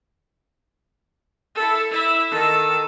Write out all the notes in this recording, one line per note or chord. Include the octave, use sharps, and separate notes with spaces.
E4 A4
E4 E5
D#3 A4